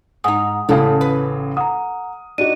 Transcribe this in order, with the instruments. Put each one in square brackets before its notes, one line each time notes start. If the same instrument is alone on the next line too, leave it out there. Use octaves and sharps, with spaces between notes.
[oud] G#2 D#4 [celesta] F#5 G#5 D#6
[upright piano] A1 C#3 F5 [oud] A2 A4
[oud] B4
[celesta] F#5 A#5 [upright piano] D#6
[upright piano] D4 D#4 F#4 [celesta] D#7